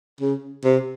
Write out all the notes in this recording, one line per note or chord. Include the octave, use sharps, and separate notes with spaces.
C#3
C3